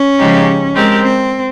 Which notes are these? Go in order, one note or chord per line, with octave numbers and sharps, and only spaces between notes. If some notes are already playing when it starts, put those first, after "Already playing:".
Already playing: C#4
C#3 F3 G#3 D#4 G4
G#3 C4 G4 A#4
C4